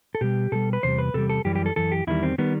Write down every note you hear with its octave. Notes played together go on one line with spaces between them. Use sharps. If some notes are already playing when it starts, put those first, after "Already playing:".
A4
B2 G3 G4
B2 G3 A4
B4
E2 C3 G3 C5
B4
E2 C3 G3 A4
A4
F#2 E3 G3 G4
G4
A4
F#2 E3 A4
G4
E2 D#3 G3 E4
C4
D#3 G3 B3